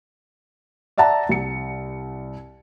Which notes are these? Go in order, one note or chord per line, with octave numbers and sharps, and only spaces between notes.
D5 E5 F#5 A5 A#5
C2 C#7